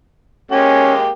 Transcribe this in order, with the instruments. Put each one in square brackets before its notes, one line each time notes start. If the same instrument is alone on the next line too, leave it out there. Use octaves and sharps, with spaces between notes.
[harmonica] G#3 A#3 G4 [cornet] C#4